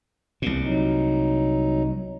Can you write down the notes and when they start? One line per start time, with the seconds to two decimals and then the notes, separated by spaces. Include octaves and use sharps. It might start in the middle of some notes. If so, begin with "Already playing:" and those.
0.42 C2 A#2
0.64 F#3 D#4